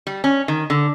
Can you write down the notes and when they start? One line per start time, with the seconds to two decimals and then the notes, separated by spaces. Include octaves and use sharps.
0.07 G3
0.24 C#4
0.48 D#3
0.70 D3